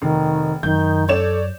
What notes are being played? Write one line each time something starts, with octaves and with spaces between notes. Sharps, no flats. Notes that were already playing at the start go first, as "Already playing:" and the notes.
F1 D#3
F#2 D#3 G6
A4 C#5 D5 E7